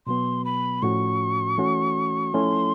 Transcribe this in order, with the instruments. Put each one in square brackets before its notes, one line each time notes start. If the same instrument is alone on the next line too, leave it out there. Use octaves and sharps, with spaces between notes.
[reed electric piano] B2 F#3 B3 [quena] C6
[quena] B5
[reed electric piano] A2 F3 A3 C#4 F#4 [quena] C#6
[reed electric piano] E3 A3 C#4 F#4
[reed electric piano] F3 A3 C#4 E4 A4 [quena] C6